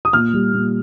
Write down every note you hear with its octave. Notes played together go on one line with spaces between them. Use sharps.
D#6
A#2 F6
G3
A#2